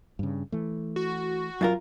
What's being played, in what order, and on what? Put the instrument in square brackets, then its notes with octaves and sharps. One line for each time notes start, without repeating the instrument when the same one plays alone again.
[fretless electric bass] G2 C#3
E3 A3
[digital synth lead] F#4
[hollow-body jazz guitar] F#2 F4 A#4